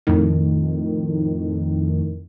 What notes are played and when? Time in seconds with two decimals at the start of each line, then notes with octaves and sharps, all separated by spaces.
0.07 F2 A2 D#3